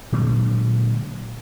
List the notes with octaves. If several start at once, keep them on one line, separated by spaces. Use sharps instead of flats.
A#2 D3 F#3 G#3